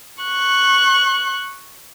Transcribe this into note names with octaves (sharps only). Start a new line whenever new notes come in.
C#6 F#6